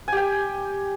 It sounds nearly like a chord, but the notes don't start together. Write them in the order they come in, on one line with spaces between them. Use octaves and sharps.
G#5 G4 G5